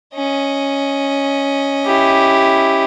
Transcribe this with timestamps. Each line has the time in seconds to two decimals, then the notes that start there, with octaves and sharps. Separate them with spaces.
0.15 C#4 D#5
1.86 E4 G4